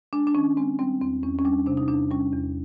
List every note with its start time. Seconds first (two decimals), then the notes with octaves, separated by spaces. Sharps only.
0.13 G#3 D4
0.27 D4
0.35 D#3 C#4
0.57 G#3 C4
0.79 G3 C4
1.01 E2 C4
1.23 E2 C#4
1.39 C#4
1.45 G3 D4
1.67 C3 D4
1.77 D#4
1.88 E2 D4
2.11 G3 C#4
2.33 E2